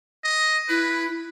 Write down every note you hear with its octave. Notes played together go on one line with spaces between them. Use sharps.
D#5
E4 B4